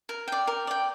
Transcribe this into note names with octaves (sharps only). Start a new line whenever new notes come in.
A#4
D5 G5
A#4
D5 G5